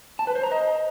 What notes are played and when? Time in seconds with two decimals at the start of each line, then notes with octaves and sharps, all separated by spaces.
0.19 A5
0.27 B4
0.35 C5
0.43 A#5
0.51 D#5